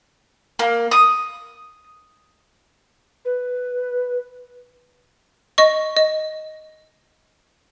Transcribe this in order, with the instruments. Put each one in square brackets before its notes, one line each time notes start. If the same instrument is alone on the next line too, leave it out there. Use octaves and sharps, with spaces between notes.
[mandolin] A#3
D#6
[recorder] B4
[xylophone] D#5 C#6
D#5